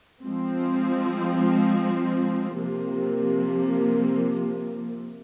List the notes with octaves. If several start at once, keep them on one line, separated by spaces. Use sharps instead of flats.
F3 G#3 C4
C3 F3 A#3